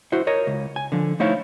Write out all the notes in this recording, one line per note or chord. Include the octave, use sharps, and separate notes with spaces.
E4 F#4 C5
A#4 C#5 D#5
C#2
G#5
D3 F3
A3 D#4 E4 C5 C#5 F5